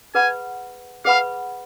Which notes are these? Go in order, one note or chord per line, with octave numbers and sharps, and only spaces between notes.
G#4 B4 F#5 G#5 B5
G#4 B4 F5 F#5 B5